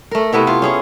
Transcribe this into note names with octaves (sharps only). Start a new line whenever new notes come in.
A3 A#4
C3 A3 B3 E4
E4 F4
C#4 G#4 C#5